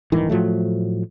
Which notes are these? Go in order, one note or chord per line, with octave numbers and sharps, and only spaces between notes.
D#1 G#1 D#3 E3
A2 F3 F#3 A3